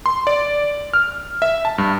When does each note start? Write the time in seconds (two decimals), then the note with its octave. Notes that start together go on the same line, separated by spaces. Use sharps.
0.06 C6
0.27 D5
0.93 F6
1.42 E5
1.65 A5
1.78 G2